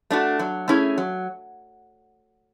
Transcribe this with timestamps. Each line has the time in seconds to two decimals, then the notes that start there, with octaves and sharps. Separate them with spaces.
0.10 A3 D4 F#4
0.39 F#3
0.68 A3 C#4 E4 G#4
0.98 F#3